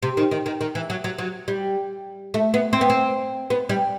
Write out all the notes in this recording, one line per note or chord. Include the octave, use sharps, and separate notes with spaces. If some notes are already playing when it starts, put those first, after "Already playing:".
C3
D#3
D#3
D#3
D#3
E3
F#3
F#3
F#3
G3
A3
B3
C4
B3
C4
B3
G3